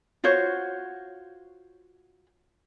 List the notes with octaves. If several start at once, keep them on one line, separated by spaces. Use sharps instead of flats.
F4 F#4 C5 C#5